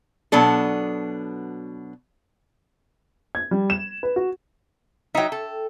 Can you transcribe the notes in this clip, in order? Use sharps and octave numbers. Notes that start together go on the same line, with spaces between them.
B2 F#3 B3 D4 A4
G#6
G3
E7
B4
F#4
F#3 D#4 E5 G5
A4